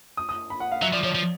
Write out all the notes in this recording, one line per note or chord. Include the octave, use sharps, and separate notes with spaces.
D#6
D#6
B5
F#5
F5
F#3 E5
F3 D5
F3 C#5
F3